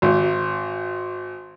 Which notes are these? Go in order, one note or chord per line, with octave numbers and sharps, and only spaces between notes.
G#1